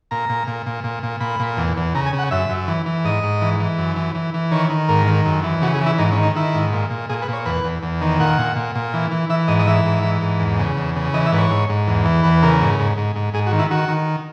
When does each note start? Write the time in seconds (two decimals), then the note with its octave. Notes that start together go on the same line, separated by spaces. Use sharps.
0.11 A#2 A#5
0.29 A#2
0.47 A#2
0.66 A#2
0.84 A#2
1.03 A#2
1.20 A#2 B5
1.40 A#2
1.57 E2
1.77 E2
1.95 C#3 A#5
2.06 G#5
2.13 C#3
2.19 F#5
2.31 F#2 E5
2.49 F#2
2.68 E3
2.86 E3
3.05 G#2 D#5
3.23 G#2
3.42 E3
3.60 E3
3.78 F#2
3.96 E3
4.15 E3
4.34 E3
4.51 D#3 C#5
4.70 D#3
4.88 G#2 A#4
5.08 D#3
5.25 F#2
5.43 E3
5.62 C#3 F#4
5.74 G#4
5.81 E3
5.86 E4
5.98 G#2 D#4
6.12 C#4
6.17 D#3
6.23 D#4
6.36 D#3 E4
6.54 G#2
6.73 A#2
6.90 A#2
7.09 A#2 G#4
7.22 B4
7.28 A#2
7.33 C#5
7.46 E2 B4
7.64 E2
7.82 E2
8.01 D#3
8.19 A#2 F#5
8.38 A#2
8.56 A#2
8.75 A#2
8.94 E3
9.11 E3
9.29 E3 E5
9.48 G#2 D#5
9.59 D#5
9.67 E3 E5
9.86 G#2
10.03 E3
10.22 G#2
10.40 E2
10.59 C#3
10.77 E2
10.96 C#3
11.14 E3 D#5
11.26 E5
11.32 G#2 B4
11.38 C#5
11.51 G#2
11.69 G#2
11.88 E2
12.05 E3
12.23 E2 B4
12.43 C#3 A#4
12.60 G#2
12.79 G#2
12.98 G#2
13.16 G#2
13.34 G#2 G#4
13.47 F#4
13.52 D#3
13.59 E4
13.71 D#3 F#4
13.89 D#3